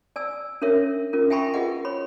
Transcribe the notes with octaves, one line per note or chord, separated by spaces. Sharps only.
D5 G#5 E6
C#4 D4 A#4 C#5 E5
C#4 F4 A#4
E5 G5 G#5 B5 C#6
F4 G#4 B4 D#5 F#5
C#5 B5